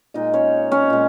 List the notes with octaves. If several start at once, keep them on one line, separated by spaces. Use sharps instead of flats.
A#2 G#3 D#4 D#5
C#4 C#5
C#4 C#5
A#2 G#3